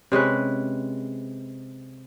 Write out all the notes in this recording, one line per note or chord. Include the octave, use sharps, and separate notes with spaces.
C3 G#3 C#4 B4